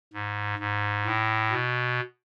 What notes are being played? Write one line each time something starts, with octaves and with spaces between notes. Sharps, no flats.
G#2
G#2
A2
B2